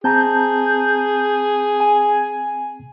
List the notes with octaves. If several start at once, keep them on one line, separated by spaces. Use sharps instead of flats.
C4 G#4 A5 A#5 G6
G#5